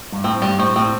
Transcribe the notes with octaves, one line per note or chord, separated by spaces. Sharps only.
G2
A2 C4
G2 G3
A2 C4
A2 C4